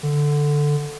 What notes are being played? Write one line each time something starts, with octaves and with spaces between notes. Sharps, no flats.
D3